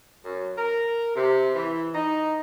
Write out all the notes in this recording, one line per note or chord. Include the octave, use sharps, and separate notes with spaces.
F#2
A#4
C3
E3
D#4